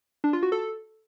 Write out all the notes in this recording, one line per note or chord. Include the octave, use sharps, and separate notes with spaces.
D4
F4
F#4
A4